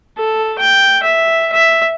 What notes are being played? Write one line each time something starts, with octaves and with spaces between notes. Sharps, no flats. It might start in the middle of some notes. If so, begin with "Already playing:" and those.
A4
G5
E5
E5